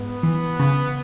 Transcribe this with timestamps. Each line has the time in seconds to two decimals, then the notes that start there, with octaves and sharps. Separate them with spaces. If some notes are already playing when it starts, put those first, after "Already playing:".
Already playing: G#2 B3
0.23 E3
0.59 C#3